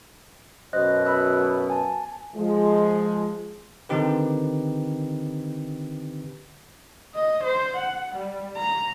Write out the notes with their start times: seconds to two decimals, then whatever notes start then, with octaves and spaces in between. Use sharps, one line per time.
0.73 F#2 B2 C5 D#5 F#6
1.05 B5 E6 F#6
1.70 G#5 A5
2.35 F3 G#3
3.89 D3 D#3 C4 D#4 G4 B4
7.15 D#5
7.44 C5
7.77 F#5
8.16 G3
8.57 A#5